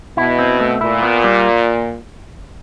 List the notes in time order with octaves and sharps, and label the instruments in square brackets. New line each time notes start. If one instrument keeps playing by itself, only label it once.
[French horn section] B2 [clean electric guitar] E4
[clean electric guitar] C4
A3
[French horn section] A#2 [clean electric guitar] E4
[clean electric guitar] B3
G3